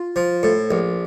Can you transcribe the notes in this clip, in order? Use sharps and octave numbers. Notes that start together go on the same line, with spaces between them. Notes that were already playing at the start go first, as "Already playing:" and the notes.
Already playing: F4
F3
A2
A#1